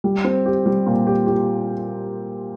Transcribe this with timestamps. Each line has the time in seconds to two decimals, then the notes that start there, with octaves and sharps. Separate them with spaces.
0.04 G3
0.24 C4
0.46 G4
0.66 G3
0.87 A#2
1.07 G4
1.27 G4